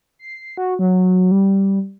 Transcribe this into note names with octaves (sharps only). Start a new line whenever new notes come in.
C7
F#4
F#3
G3